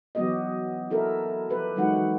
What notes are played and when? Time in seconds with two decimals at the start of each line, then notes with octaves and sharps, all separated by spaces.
0.15 E3 F#3 B3 F#4 G4 D#5
0.90 E4 A4 A#4 E5
1.49 F3 G4 B4
1.76 E3 F#3 G#3 D#4 F#4 F#5
1.96 E3